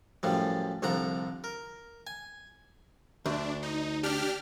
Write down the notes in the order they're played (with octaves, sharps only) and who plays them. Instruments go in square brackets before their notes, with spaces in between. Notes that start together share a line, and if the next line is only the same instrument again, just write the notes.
[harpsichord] F#2 A2 F3 G3
C2 D3 F3 F#5 A#5
A#4
G#5
[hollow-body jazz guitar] D2 [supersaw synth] D4
[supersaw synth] D#4
D4 G4 F6